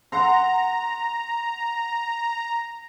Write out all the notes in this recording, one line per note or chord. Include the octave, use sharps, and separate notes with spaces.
F#5 A#5 C6